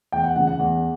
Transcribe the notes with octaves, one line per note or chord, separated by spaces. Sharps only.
E2 G5
F#5
C#3 E3 F#5
F#5
E2